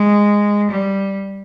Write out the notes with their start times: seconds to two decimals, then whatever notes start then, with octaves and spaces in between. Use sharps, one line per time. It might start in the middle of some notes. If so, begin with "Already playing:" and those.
Already playing: G#3
0.71 G3